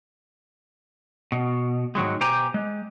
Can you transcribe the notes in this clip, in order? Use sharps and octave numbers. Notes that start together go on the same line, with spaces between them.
B2
G#2 D#3 F#3 G#3
B2 G4 C5 G#5 A#5
G#3